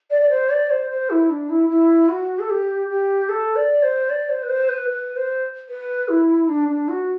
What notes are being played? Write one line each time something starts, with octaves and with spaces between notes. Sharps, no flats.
D5
D5
C5
D5
C5
C5
E4
D4
E4
E4
F#4
A4
G4
G4
A4
D5
C5
D5
C5
B4
C5
B4
B4
C5
B4
E4
D4
D4
F#4